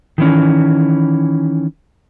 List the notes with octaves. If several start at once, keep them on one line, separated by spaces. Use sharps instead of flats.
D#3 E3 C#4